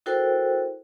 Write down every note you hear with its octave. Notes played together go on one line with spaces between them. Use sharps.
E4 F#4 A4 A#4 C5 G5